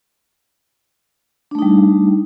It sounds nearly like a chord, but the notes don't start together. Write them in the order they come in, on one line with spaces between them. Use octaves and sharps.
D4 A3 D#4 G3